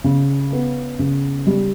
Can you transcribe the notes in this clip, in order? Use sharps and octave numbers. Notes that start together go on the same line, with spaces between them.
C#3
B3
C#3
G3